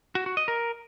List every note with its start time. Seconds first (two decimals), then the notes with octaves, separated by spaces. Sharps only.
0.15 F#4
0.26 F#4
0.37 D#5
0.48 A#4